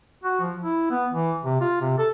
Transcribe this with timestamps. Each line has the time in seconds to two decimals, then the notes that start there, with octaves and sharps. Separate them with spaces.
0.24 F#4
0.41 F3
0.64 E4
0.91 B3
1.12 E3
1.44 C3
1.61 F4
1.81 C3
1.98 A4